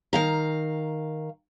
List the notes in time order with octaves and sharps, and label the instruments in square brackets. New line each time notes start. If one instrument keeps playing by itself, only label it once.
[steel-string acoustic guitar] D#3 F5 A#5